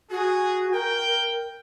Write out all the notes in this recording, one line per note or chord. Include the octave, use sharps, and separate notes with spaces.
F#4 G#4
A#4 G5